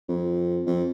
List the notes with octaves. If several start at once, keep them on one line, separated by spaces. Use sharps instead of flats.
F2
F2